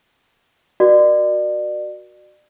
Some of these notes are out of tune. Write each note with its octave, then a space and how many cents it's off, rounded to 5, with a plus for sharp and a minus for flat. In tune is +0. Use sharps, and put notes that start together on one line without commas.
F#4 +0 A#4 +40 D5 +35